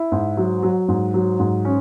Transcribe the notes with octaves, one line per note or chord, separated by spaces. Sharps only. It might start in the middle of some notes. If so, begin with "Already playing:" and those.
Already playing: E4
G#2
F#3
F#3
G#2
F#3
G#2
C#4